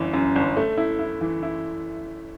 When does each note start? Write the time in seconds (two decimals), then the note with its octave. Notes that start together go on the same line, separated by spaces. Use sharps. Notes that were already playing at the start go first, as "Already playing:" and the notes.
Already playing: G1 F#2 E3
0.13 F#2
0.36 G1
0.57 A3
0.77 E4
0.99 E4
1.21 E3
1.43 E4